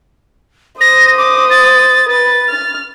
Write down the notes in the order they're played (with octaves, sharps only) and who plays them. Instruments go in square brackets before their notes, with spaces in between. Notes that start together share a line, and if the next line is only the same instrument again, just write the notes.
[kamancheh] C5 D#6 [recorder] A#6
[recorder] D6
A6
[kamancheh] B4 [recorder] A6
[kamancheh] F6